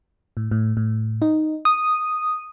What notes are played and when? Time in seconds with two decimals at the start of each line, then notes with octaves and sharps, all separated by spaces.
0.37 A2
0.51 A2
0.77 A2
1.22 D#4
1.65 D#6